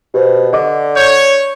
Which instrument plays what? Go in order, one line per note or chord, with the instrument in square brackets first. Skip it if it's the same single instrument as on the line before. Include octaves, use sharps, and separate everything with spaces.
[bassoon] B2 [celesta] G4 C5
[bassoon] D3 [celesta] D5 D#5 D6
[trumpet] C#5 [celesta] G6 G#6